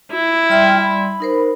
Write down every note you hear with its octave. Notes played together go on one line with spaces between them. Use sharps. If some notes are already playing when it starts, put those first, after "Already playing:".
E4
G3 D5 E5 G5 C6 F6
B5
D#4 A#4 C5